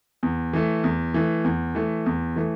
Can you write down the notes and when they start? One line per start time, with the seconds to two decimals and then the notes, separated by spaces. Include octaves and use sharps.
0.23 E2
0.53 E3 A3
0.84 E2
1.14 E3 A3
1.44 E2
1.75 E3 A3
2.06 E2
2.36 E3 A3